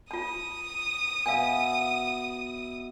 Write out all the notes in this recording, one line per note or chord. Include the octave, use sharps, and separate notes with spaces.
F4 A5 D#6
B2 E5 F5 G#5